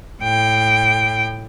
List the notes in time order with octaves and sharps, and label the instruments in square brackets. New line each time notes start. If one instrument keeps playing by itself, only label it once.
[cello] A2 G5